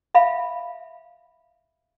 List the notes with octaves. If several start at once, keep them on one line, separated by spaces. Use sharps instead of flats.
E5 F5 B5